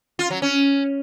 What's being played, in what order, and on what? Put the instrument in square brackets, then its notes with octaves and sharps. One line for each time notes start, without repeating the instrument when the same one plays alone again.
[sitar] F4
F#3
C#4